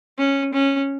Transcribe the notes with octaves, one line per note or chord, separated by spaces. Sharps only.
C#4
C#4